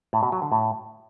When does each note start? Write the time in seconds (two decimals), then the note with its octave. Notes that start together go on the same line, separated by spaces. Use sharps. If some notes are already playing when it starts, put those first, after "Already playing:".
0.13 A2
0.23 B2
0.32 F#3
0.42 D3
0.52 A2